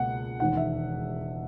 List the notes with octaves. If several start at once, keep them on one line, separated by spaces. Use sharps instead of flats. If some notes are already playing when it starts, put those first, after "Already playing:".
Already playing: C#2 B2 A#3 C#4 F#5
E1 D#2 D#3 F#5
E5